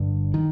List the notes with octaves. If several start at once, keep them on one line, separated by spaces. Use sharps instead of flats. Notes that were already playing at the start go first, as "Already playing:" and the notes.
Already playing: G1 G2 D3
D#3